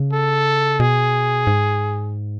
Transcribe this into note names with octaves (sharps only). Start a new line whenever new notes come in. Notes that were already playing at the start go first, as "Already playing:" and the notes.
Already playing: C#3
A4
B2 G#4
G#2